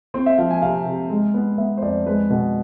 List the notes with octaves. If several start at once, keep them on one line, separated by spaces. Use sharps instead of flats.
C4 C5
E5
F3 F5
G#5
C3 F5
C3
G#3
B3
B3 E5
C5
F2 D5
G#3 B4
B2